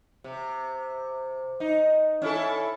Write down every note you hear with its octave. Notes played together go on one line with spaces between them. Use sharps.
C3
D#4
C#4 E4 A4